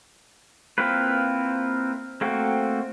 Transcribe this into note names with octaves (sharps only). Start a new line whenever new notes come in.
A#3 C4 E4 F4 B4
A3 A#3 C4 F#4